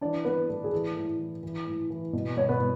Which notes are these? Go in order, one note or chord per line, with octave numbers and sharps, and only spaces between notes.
E3 D4 D5
E3 B3 B4
A2 A4
G#4
E3 A4
A2
E3
E3
A2
E3
B2
B2 C#5
B3 B4
B2